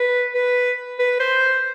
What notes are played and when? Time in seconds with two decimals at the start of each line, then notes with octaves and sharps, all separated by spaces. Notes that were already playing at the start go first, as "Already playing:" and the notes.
Already playing: B4
0.34 B4
0.99 B4
1.20 C5